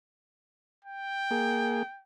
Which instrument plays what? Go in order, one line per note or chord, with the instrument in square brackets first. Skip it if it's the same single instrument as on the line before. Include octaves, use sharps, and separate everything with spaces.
[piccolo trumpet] G5
[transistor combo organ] A#3 G#4